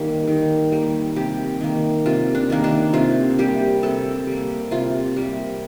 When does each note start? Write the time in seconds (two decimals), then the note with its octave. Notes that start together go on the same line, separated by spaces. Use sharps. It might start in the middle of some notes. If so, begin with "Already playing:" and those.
Already playing: D#3 G3 A#3
0.27 D#3
0.72 G3 A#3
1.16 C3 G4
1.61 D#3 A#3
2.06 C3 F4
2.35 D4
2.50 D#3 A#3
2.64 D4
2.93 C3 F4
3.39 G3 A#3 G4
3.83 C3 A4
4.27 G3 A#3
4.71 C3 F4
5.16 G3 A#3